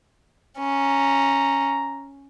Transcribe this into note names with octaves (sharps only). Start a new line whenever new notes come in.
C#4 A#5